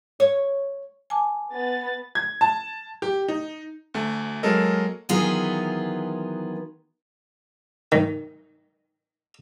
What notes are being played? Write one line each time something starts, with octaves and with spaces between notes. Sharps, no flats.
C#5
G#5 A5 D6
B3 A6
G#6
A5
G4
D#4
D2 A3
F#3 G#3 A#3 A4 A#4 D#5
D#3 E3 F#3 B3 F4 G#4
D#3